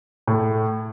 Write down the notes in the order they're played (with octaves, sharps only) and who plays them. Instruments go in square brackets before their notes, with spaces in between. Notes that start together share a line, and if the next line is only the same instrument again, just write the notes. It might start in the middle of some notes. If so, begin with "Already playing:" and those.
[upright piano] A2